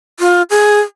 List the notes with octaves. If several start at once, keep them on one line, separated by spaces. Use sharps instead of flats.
F4
G#4